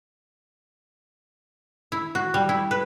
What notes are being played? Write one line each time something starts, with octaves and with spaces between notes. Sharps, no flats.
E4
F#4
G3
E4
B4